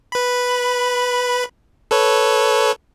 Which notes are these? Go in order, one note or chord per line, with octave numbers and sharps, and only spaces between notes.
B4 B5
A4 B4 C#5